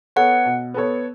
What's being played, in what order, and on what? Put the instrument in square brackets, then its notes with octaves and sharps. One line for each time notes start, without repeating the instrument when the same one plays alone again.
[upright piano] B3 A4 C#5 [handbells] F#5
[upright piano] B2
B3 A4 C#5